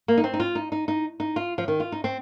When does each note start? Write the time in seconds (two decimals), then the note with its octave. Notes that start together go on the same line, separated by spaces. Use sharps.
0.08 A#3
0.18 D#4
0.24 C4
0.34 D#4
0.40 F4
0.55 D#4
0.72 D#4
0.88 D#4
1.20 D#4
1.36 F4
1.58 F3
1.68 D#3
1.80 F4
1.92 D#4
2.04 C4